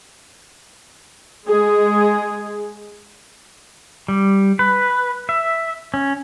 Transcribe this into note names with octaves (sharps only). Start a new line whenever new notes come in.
G#3 G#4
G3
B4
E5
C#4